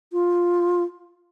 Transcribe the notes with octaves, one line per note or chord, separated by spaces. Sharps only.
F4